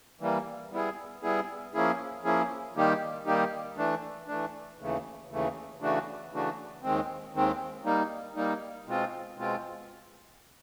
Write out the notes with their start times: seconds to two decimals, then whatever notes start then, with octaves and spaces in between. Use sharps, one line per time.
0.20 E3 G3 A#3
0.72 G3 B3 E4 G#4
1.23 G3 B3 E4 G#4
1.74 F3 A#3 C#4 E4 G#4
2.24 F3 A#3 C#4 E4 G#4
2.76 D#3 G3 A#3 D#4 G4
3.26 D#3 G3 A#3 D#4 G4
3.77 E3 A3 D4
4.28 E3 A3 D4
4.79 D#2 C#3 E3 A3
5.30 D#2 C#3 E3 A3
5.81 C#3 E3 A3 D4 F#4
6.32 C#3 E3 A3 D4 F#4
6.83 D#2 D#3 G#3 C4
7.33 D#2 D#3 G#3 C4
7.85 G3 A#3 D#4
8.35 G3 A#3 D#4
8.87 B2 G#3 C4 F4
9.37 B2 G#3 C4 F4